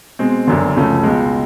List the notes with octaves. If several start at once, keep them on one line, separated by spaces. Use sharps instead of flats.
B2 G#3 C4
F#1 F#2 D3
C#2 C#3 F3 A3 C#4
C#2 B2 G#3